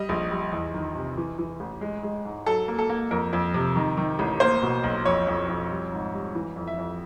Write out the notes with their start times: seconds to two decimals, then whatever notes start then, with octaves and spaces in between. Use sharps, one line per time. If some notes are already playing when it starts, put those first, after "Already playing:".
Already playing: G3 D#5
0.09 A#1
0.31 G3
0.52 E2
0.74 D#3
0.95 C3
1.17 E3
1.38 E3
1.60 A1
1.81 G#3
2.03 G#3
2.25 G#2
2.46 F#3 A4
2.68 A#3
2.79 A4
2.90 A#3
3.11 F2 A#4
3.33 F2
3.54 C3
3.76 D#3
3.97 D#3
4.19 A1
4.40 A#3 C5
4.62 B2
4.84 B1
5.05 F2 C#5
5.27 F2
5.49 F2
5.70 G3
5.92 G#2
6.13 G3
6.35 E3
6.56 F2
6.67 E5
6.78 F2